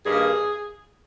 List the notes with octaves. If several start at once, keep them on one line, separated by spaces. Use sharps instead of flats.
G2 D#3 A#3 G#4